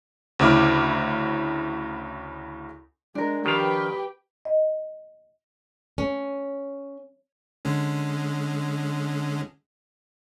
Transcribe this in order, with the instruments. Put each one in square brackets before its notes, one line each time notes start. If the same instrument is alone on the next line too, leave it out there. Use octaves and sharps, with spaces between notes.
[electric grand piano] D2 C#3 E4 D6 F6
[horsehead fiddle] G#3 [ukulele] D4 A#4
[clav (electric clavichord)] D#3 F3 F5 [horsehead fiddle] G4 [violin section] B4 G5
[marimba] D#5
[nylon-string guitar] C#4
[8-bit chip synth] D3 G#3 C#4